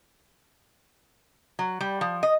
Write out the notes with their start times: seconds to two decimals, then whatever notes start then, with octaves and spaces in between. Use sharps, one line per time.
1.59 F#3
1.81 G3
2.01 F3
2.23 D#5